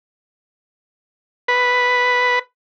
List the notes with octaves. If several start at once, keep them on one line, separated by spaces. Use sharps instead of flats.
B4